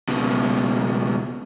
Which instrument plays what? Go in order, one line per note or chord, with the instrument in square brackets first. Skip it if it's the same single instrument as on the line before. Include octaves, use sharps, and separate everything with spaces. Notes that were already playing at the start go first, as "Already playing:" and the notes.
[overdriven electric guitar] C#2 B2